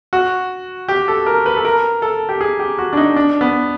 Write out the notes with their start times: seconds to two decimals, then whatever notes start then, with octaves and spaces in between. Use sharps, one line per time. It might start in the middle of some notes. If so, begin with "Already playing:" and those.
0.13 F#4
0.88 G4
1.08 A4
1.26 A#4
1.46 B4
1.56 A4
1.65 A#4
2.02 A4
2.29 G4
2.41 G#4
2.59 G4
2.78 F#4
2.93 D4
2.97 D#4
3.16 D4
3.41 B3